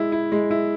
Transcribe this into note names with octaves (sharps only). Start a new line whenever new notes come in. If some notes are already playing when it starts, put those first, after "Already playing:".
Already playing: G#3 E4
E4
G#3
E4